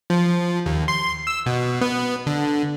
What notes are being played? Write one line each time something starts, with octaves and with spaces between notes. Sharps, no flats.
F3
D#2
C6
E6
B2
B3
D3